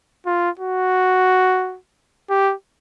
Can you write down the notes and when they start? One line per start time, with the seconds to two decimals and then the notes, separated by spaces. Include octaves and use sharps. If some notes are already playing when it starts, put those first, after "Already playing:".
0.26 F4
0.59 F#4
2.30 G4